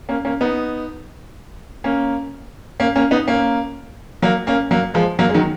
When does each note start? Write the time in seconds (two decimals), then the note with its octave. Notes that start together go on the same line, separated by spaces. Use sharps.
0.09 A#3 C#4
0.25 A#3 C#4
0.41 B3 D#4
1.84 A#3 C#4
2.80 A#3 C#4
2.95 A#3 C#4
3.11 B3 D#4
3.27 A#3 C#4
4.22 F#3 A#3
4.47 A#3 C#4
4.71 F#3 A#3
4.94 F3 G#3
5.19 F#3 A#3
5.29 G#3
5.34 D#3 F#3